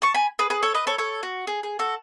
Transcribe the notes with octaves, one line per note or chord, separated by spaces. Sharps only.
A5 C#6
G#5 B5
G#4 B4
G#4 B4
A4 C#5
B4 D#5
A4 C#5
A4 C#5
F#4
G#4
G#4
F#4 A4